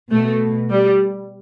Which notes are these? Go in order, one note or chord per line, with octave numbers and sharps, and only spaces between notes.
B2 A3
G3